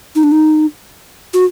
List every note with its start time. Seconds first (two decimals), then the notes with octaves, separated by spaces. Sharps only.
0.15 D#4
0.23 D4
0.32 D#4
1.34 F#4